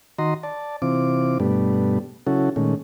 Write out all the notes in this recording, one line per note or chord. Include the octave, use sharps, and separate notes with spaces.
D#3 F#4 D#5 A#5 C6
D5 A5
C3 E3 C4 F4 D6
G2 B2 G3 A3 B3 D4
C#3 F#3 C#4 E4 F#4 A4
A#2 D#3 G#3 A3 C#4